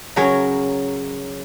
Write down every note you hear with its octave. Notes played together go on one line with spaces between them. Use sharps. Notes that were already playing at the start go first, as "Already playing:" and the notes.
C#3 F#3 A#4 C#5